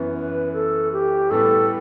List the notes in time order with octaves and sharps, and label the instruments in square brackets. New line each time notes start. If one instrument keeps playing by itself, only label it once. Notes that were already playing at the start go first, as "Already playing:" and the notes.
Already playing: [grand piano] F#2 E3 B3
[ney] B4
A4
G4
[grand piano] A2 G3 B3 [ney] A4